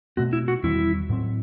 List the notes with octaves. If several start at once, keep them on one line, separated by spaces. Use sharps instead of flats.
B2 A3 C4 F#4
E4
F#4
E2 D#3 G3 C4 E4
A2 F#3 C4